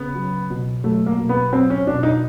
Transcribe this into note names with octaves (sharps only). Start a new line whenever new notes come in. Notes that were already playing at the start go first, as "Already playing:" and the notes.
Already playing: C#3 B3
F#3
B2
F#3 A3
A#3
B2
B3
F#3 C4
C#4
B2 D4
D#4